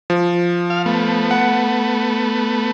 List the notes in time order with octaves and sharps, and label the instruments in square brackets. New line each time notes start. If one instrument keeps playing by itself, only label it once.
[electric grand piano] F3
[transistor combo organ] F5
A3 B3
[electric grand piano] F#5